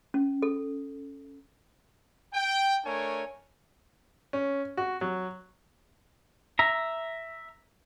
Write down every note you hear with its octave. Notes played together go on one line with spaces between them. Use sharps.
C#4
A4
G5
A3 D4 A#4 C#5 G#5
C#4
F#4
F#3
E5 A#5